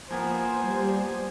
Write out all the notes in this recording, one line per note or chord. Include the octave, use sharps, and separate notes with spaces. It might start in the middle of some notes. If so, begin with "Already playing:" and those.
F3 A#3 B3 C5 G#5
G3